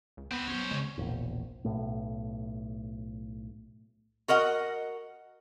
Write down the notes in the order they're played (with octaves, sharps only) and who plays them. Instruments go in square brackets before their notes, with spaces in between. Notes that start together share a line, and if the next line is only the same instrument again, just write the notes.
[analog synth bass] C#2
[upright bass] D#2 [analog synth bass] B3 [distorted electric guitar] C4 B4
[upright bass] G1 F#3 [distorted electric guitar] C#4 C5
[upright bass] C#3 [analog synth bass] G#3
[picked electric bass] E1 A#1
B1 A2
[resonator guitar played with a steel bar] F#4 A#4 D#5 F#5